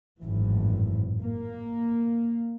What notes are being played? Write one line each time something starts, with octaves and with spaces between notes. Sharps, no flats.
G#1 F#2 A2 E3
A#3